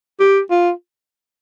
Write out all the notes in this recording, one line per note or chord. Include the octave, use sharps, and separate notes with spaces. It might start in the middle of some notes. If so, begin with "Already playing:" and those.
G4
F4